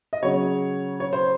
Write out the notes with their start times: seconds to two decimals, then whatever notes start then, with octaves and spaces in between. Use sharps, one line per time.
0.13 D#5
0.23 C#3 F#3 C#5
1.00 C#5
1.13 C5